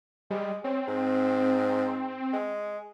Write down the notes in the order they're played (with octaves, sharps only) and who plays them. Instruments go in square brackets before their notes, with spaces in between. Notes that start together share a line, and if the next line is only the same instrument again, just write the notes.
[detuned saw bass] G3 [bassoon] G#3
[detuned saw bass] C4 [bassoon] C#4
[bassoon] G#2
G#3